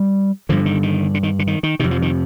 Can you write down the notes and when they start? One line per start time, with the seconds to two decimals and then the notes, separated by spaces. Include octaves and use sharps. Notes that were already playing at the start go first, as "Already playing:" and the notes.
Already playing: G3
0.49 G2 D3 F3
0.66 D#3
0.83 D#3
1.14 D3
1.23 D#3
1.39 D3
1.47 D#3
1.63 D#3
1.80 F2 C3 D#3
1.91 F3
2.02 D#3